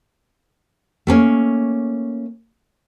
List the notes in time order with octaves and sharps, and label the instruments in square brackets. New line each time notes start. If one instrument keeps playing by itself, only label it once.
[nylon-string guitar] A3 A#3 C#4